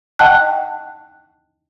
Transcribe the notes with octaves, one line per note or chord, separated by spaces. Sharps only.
D#5 F#5 G5 A5 F#6